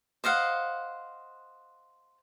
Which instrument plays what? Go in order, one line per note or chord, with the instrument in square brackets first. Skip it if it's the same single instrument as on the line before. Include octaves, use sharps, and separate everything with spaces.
[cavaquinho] C5 D#5 F5 F#5